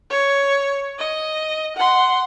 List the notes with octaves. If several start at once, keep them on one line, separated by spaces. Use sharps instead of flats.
C#5
D#5
F#5 C6